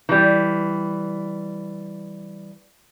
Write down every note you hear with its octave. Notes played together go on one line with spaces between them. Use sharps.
E3 G3